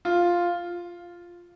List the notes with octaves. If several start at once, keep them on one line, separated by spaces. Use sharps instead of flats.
F4